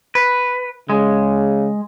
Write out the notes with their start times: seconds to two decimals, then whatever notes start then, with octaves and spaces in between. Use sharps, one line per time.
0.15 B4
0.90 C#3 G#3